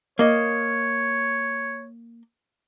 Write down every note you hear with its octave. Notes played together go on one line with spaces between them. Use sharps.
A#3 C#5 D#5